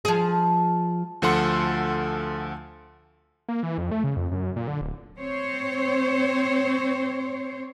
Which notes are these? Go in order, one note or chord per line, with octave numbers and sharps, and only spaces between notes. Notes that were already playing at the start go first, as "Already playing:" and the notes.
F3 G#4
D2 F3 A4 F#5 C6 C#7
A#3
E3
F2
A3
C#3
F2
F#2
A#2
D3
D1
C4 C5 C#5